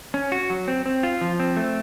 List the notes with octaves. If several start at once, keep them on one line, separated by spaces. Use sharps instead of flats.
C#4
F#4
F#3
C4
C4
F4
F3
C4
A3